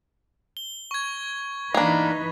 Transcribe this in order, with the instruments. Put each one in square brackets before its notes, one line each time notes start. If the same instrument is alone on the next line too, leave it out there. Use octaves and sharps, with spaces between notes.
[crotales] G7
C#6 G#6
[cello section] E3 D#4 B4 [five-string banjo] A#3 D4